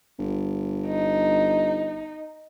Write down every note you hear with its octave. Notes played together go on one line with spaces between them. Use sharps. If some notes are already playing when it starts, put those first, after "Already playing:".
G1
D#4